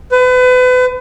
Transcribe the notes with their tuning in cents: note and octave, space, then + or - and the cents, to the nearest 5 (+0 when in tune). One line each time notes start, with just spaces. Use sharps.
B4 +35